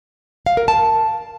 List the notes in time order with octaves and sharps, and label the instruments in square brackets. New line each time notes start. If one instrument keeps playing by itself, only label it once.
[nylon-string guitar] F5
A#4
A5